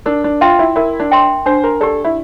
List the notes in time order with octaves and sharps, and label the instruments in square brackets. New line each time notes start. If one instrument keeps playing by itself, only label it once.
[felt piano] D4 [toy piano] A#4
[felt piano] D4
[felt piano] F4 [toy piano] E5 G5 C6
[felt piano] E4
[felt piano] E4 [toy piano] A#4
[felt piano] D4
[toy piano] E5 G5 C6
[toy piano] D4 [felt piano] C5
[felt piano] A#4
[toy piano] G4 D5 [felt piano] A4
[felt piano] E4